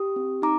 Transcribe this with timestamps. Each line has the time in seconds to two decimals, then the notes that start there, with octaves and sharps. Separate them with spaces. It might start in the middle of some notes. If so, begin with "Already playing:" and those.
Already playing: G4 D#6
0.16 C4
0.42 D#4 A#5 D6